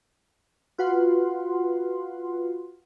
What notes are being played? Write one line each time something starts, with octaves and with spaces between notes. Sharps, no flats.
F4 F#4 B4 F#5 C6